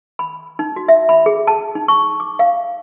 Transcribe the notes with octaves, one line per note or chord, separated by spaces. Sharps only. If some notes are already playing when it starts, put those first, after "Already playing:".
B5
D#4
F#4
E5
B5
G#4
A5
D#4
C#6
D6
F5